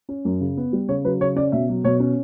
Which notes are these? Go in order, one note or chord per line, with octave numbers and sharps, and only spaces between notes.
C#4
F#2
C#3
B3
G3
C#3 C#5
F#3 B4
C#3 C#5
C#4 D5
B2 E5
F#3
B2 C#5
C#4